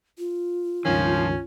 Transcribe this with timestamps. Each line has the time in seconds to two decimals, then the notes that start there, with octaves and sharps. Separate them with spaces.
0.18 F4
0.85 C#2 G2 D#3 F3 C#4